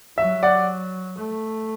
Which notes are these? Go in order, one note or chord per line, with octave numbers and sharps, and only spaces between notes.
F#3 E5
D5 F#5
A3